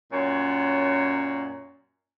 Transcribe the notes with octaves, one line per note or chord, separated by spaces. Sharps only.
F#2 A#2 C#5